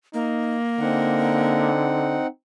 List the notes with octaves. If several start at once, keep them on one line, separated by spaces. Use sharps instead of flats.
A#3 D#4
D3 C4 D#4 F#5